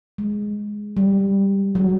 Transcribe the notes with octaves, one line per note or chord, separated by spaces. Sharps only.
G#3
G3
F#3